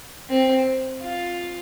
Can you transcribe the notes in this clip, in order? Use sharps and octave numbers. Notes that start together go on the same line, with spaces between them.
C4
F4